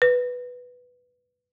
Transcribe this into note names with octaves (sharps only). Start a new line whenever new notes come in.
B4